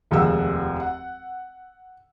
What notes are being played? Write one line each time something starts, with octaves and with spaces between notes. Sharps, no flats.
F1 D#2 F3 G#3 F#5 E6
F#5